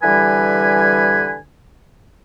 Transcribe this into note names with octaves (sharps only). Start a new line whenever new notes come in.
D3 E3 G3 G4 B4 G#5